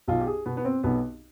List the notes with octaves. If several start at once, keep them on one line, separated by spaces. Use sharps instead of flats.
B1 F4
G4
G#4
B2 B3
B3
C4
B1 B3